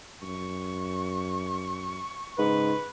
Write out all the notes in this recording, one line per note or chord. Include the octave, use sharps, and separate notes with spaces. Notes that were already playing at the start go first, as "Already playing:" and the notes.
F#2 C#6
G#2 C#3 B4